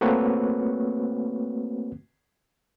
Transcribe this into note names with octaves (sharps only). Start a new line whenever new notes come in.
A3 A#3 C4 F#4 B4 C#5